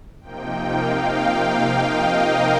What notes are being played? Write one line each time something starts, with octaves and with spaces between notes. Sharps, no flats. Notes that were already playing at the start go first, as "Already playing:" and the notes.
C3 F3 A#3 D#4 G5
F5
G5
F5
D#5
A#4